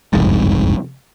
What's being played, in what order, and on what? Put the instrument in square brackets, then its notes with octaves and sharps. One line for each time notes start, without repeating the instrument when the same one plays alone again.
[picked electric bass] F#1 C2 F2 G#2